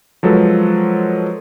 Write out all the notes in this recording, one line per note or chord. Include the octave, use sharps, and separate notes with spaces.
F3 F#3 G#3 A4 B4 C5